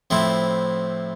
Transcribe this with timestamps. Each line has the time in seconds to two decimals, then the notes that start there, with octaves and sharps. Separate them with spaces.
0.10 A2 F3 C4 E4